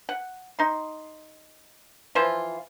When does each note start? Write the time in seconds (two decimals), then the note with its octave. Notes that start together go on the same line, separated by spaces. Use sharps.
0.09 F#5
0.59 D#4 C6
2.15 E3 F3 F4 C5